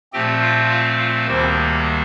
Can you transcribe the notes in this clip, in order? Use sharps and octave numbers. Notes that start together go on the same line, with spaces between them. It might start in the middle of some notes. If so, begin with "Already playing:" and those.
A#2 F3 A3 C4 G4 G5
F4 F5
F4 F5
F4 F5
D2 C3 D#3 G3 A#3 C4 C5